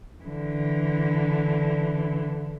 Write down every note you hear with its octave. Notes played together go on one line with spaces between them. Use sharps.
D3 E3